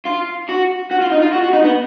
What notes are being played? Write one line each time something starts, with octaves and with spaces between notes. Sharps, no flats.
F4
F#4
F#4
F4
D#4
F4
F#4
F#4
D#4
B3